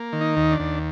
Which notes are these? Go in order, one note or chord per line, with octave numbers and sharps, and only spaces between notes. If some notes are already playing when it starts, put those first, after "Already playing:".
Already playing: A#3
D#3
D#4
D#2
D4
D#2